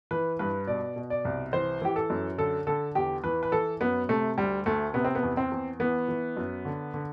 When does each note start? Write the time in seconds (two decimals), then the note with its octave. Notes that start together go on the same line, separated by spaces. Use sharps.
0.11 E3 B4
0.39 G2 B4
0.67 B2 D5
0.96 B2
1.10 D5
1.25 C2
1.53 E3 C5
1.82 E3 G4
1.96 A4
2.10 F#2
2.38 D3 A4
2.67 D3 A4
2.95 E2 G4
3.24 E3 B4
3.43 B4
3.52 E3 A4
3.81 F#2 B3
4.09 C3 A3
4.38 D2 G3
4.66 D2 A3
4.94 C3 B3
5.05 C4
5.15 B3
5.23 E2
5.37 C4
5.52 E2
5.80 E3 B3
6.09 E3
6.37 F#2
6.65 D3
6.94 D3